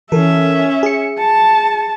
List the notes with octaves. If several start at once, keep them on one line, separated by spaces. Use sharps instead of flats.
E3 C#4 A4 A#4 E5
G#4 C#7
A5